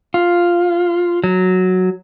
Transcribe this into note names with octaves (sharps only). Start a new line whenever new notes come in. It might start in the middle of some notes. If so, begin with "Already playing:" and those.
F4
F#3